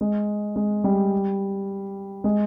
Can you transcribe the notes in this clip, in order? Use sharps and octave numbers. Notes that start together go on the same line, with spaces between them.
G#3
G#3
G3
G#3